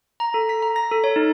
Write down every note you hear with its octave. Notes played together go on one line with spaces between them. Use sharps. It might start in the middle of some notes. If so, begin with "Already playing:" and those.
A#5
A4
B6
A#5
A#6
A4
C#5
D#4